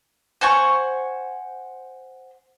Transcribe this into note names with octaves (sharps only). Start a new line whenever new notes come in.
C5 F#5 G#5 C#6